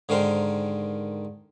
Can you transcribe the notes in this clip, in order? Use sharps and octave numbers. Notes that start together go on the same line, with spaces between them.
G#2 D3 D#3 A#4 C5